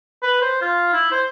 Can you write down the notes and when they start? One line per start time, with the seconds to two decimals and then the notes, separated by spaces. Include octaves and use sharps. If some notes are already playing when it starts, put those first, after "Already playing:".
0.23 B4
0.42 C5
0.62 F4
0.93 E4
1.12 C5